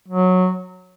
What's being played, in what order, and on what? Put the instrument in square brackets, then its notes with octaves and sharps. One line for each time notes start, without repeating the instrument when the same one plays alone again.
[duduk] F#3